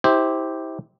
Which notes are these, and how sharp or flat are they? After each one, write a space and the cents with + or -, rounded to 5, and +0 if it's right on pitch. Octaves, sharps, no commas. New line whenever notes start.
E4 -35 G4 +0 C5 +0